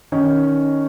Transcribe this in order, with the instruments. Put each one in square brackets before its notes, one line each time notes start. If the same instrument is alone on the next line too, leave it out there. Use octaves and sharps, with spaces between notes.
[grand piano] D#3 C#4 D#4